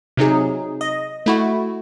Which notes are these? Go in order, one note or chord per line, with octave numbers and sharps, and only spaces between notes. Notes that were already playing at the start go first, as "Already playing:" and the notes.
C3 F#3 D#4 G#4
D#5
A3 E4 F#4